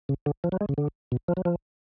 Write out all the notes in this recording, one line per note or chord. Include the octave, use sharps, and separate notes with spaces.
C#3
D3
F3
F#3
G#3
C#3
D3
B2
F3
F#3
F3